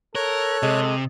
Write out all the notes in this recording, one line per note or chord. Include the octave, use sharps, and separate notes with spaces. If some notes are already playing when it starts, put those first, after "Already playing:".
A4 A#4 C#5 F#6
C3 G#3